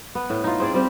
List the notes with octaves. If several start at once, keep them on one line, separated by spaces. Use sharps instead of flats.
B3
A2
D#4 F4
C4 G#4 D5
G3 C4 G4